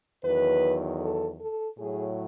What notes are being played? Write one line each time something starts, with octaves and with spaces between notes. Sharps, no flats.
E2 D#3 F#3 B4
A4
A4
A2 F#3 G#4